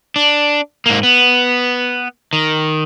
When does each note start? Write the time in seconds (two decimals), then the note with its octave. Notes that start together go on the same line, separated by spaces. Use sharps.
0.16 D4
0.86 G#2 A#3
1.03 B3
2.33 D#3